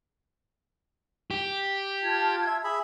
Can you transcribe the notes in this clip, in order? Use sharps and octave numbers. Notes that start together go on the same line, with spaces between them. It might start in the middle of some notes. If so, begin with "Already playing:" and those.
G4
F4 A5 G#6
E5
G#4 E5 B5